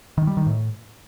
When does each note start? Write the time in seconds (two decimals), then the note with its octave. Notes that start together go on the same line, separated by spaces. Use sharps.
0.18 D#3
0.27 G3
0.37 D#3
0.47 A2